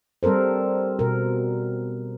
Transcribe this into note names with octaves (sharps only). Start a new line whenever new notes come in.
G3 C4 A4 A#4 C5
B2 A#4